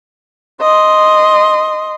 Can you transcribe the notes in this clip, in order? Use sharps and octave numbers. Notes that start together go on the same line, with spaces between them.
D#5 C6